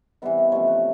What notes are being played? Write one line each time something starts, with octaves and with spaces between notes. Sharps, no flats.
C3 E3 G3 B3 E5
D#5
C3 F3 A3 C#4 C#5
B4